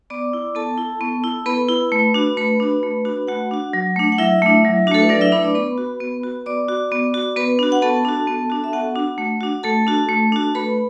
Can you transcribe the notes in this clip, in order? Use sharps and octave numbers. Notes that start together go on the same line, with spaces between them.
B3 D5 D6
E4
B3 A4 A5
E4
B3
E4
B3 B4 B5
E4
A3
D4 F#4
A3 B4 B5
D4 F#4
A3
D4 F#4
A3 F#4 F#5
D4 F#4
F#3
A3 D4
F#5
F#3 E4 E5
A3 D4
F#3
A3 D4 F#4 A4
B4
F#3 D4 D5
E4 E5
A3 D4 B4 B5
D5 D6
B3 B4 B5
F#4
B3
F#4
B3 D5 D6
F#4
B3
F#4
B3 B4 B5
D4 F#4
F#5
B3 A4 A5
D4 F#4
B3
D4 F#4
E5
B3 F#4 F#5
D4 F#4
A3
D4 F#4
A3 A4 A5
D4 F#4
A3
D4 F#4
A3 B4 B5